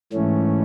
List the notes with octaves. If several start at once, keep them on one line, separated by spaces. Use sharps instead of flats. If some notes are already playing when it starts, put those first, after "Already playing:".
G#2 E3 A3 C#4